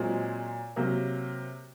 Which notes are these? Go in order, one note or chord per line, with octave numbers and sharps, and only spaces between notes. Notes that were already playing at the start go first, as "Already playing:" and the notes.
Already playing: A#2 F#3 G#3 C4
C3 F#3 A#3